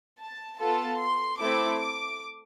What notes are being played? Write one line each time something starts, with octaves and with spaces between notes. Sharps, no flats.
A5
B3 F4 A4 A5
C6
A3 C4 E4 A4 D6
D6